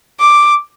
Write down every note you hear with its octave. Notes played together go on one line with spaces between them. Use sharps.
D6